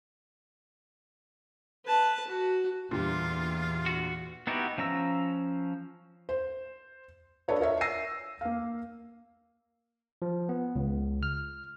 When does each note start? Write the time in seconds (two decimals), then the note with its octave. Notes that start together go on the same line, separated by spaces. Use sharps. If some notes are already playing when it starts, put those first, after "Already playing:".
1.86 B4 A5
2.28 F#4
2.91 E2 A#2 D3 G3 F4
3.86 F#4
4.47 B3 D#4 E4 F#4 G4
4.78 F3 C#4 A#5 E6
6.29 C5
7.48 D4 A4 B4 C#5 D#5
7.60 F4 A#4 C#5 E5
7.81 E6 A#6 C7 D#7
8.41 A#3 F5
10.22 F3
10.49 B3
10.76 C#2
11.23 F6